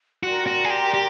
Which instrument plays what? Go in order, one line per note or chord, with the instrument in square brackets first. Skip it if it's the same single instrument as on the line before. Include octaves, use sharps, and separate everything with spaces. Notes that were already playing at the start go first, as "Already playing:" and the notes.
[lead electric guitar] F#4 [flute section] A#4 D5 G5 C6
[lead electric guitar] F#4
G#4
G4
G4